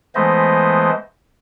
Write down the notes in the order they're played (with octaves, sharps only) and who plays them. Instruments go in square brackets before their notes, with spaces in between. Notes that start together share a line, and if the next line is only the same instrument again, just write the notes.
[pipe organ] E3 G#3 A3 B3 C5 D#5